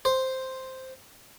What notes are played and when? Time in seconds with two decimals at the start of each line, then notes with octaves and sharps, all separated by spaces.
0.05 C5